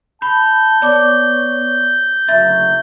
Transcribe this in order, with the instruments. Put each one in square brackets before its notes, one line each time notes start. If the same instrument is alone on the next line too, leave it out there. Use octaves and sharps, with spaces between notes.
[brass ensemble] A5 [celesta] B5 [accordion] G6
[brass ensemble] B3 C#5 [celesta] D5 D6
[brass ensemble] F#1 D2 F#3 [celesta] E5 A6